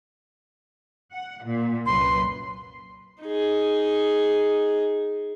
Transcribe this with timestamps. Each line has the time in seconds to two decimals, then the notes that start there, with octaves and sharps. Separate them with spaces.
1.13 F#5
1.43 A#2
1.86 C2 F#2 B4 C6
3.23 D#4 G#4